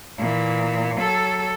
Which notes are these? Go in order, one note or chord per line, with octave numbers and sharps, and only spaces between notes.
A#2 E3
F#3 A4